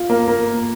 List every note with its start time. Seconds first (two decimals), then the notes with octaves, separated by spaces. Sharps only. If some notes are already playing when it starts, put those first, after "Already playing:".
Already playing: F4
0.10 A#3
0.28 A#3